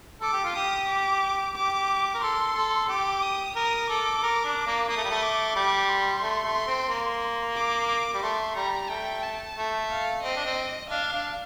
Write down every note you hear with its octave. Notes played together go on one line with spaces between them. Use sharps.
A4 D6
G4
F4
G4 D#6
D6
G4 D6
A#4
A4 C6
A4
G4 D6
D#6
A#4 D#6
A4 D6
A#4
D4
A#3
A#3 D#6
A3
G3
A3
D6
G3 D6
C6
A3
A3
C4
A#3
D6
G3
A3 C6
G3 A#5
A3 G5
A5
A3
F5
C4 D#5
D4
C4
D4 F5
D4